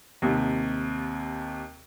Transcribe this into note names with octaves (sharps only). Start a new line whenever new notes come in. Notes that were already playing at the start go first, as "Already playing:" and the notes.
D#2 C3